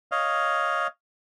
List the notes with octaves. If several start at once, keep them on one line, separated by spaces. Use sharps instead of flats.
C#5 D#5 F5